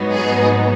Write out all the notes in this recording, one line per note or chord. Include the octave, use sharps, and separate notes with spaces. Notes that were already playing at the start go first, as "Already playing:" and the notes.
Already playing: G#2 F#3 B3 D#4
G#4